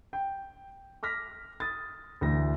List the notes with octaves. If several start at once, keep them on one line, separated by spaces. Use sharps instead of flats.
G5
D6 F6 A#6 B6
D#6 A6
D2 E3 A#6